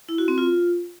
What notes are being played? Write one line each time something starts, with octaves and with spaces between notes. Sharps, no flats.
E4
F#4
C4
F4